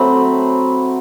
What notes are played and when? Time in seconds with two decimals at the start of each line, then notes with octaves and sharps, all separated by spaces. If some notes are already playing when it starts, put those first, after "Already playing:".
Already playing: F#3 A3 C4 B5